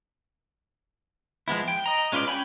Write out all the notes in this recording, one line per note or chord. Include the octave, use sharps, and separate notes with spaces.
F3 G#3 B3 E4
G5
D#5 A#5
G#3 C#4 F4 B4 D5
C#4 G5 G#5 B5